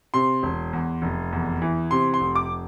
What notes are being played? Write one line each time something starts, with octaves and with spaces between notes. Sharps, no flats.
C3 C6
E1
E2
F1
E2
E3
C3 C6
C6
F1
D6